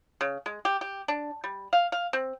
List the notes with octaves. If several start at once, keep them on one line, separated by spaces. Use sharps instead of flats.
C#3
G#3
G4
G4
D4
G3
F5
F5
C4